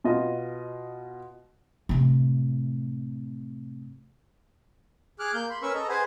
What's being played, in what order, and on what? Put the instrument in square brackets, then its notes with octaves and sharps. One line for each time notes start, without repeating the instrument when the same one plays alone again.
[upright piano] B2 F4 D#5
[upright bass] A2 C3
[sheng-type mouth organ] G#4 D6 F6 F#6
A#3 G6
B5 C6
C#4 A#4 B4 C#6 E6
A4 D#5 A#5
G#4 B4 C5 F#5 G#5